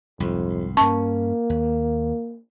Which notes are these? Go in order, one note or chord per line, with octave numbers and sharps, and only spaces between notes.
C2 F2 G#2
G2 A#3 C#4 A5 C#6
D#2